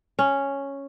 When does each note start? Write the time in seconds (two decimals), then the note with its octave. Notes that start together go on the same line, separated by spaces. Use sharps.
0.19 C#4